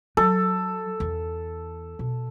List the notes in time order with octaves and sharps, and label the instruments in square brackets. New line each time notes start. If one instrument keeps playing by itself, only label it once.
[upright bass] F#3 [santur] A4
[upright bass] E2
B2